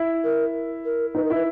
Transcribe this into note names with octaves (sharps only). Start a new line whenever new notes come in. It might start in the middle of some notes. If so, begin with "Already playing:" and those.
Already playing: E4
A#4
A#4
D#4 B4
A#4
E4 B4